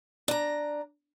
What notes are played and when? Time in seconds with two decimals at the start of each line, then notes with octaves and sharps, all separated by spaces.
0.28 D4 A#5